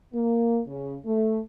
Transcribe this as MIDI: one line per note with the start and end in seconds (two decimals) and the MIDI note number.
0.13 0.60 58
0.66 0.96 49
1.06 1.40 57